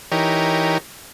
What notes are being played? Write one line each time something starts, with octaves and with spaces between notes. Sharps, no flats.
E3 D#4 G4 A#4 C#5